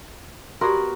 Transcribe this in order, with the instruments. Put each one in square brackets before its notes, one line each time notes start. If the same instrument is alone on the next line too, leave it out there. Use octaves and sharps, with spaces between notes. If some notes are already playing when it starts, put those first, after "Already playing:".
[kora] B3 F#4 A#4 [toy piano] G4 D5 C6